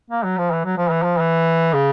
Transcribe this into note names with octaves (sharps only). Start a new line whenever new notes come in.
A#3
F#3
F3
E3
F#3
F3
E3
F3
E3
C#3